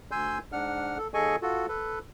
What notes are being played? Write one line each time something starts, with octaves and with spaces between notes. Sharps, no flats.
D2 G#5 C6 E6 G6
G#2 D4 F#5 F6
A4
D#2 G#4 A4 D#5 G#5 C#6
F4 F#4 A4
A4 B4